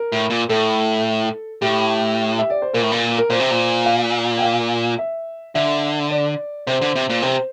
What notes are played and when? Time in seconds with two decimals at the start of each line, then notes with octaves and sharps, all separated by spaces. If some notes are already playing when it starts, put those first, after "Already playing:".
Already playing: A#4
0.12 A2
0.30 A#2
0.49 A2 A4
1.62 A2 G4
2.39 E5
2.50 D5
2.62 C5
2.73 A#2 A#4
2.82 A2
2.92 A#2
3.18 A#4
3.30 A#2 C5
3.40 C3
3.51 A#2
3.86 F5
4.38 G5
4.42 F5
4.98 E5
5.55 D3 E5
6.10 D5
6.67 C3 C5
6.81 D3
6.95 C3
7.10 A#2
7.22 C3 C5